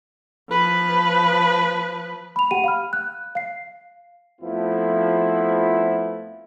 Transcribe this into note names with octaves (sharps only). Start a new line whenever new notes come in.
F3 B4
B5 F7
G4 F#5 G5 D#7
F5 B5 F6
F#6
F5 C7
F2 F3 A3 B3 E4